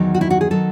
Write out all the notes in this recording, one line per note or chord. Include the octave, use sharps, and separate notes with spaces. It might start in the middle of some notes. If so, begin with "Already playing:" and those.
Already playing: E2 D#3 F#3
F#4
E4
F#4
G#4
D#3 F#3 A4